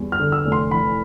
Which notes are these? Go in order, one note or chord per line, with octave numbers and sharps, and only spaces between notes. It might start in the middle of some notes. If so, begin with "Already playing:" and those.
Already playing: E2 G3
F6
D3
E6
F1
C6
E3 B5